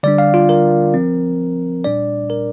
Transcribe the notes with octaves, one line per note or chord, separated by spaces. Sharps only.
D3 G3 D4 D5
F5
F4
A#4
F3 C4
A#2 G3 D4 D5
A#4